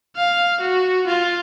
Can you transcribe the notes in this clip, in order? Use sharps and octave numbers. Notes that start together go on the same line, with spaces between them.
F5
F#4
F4